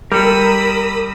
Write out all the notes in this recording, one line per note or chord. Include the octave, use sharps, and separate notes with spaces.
G3 A4 A#4 B5 D#6 E6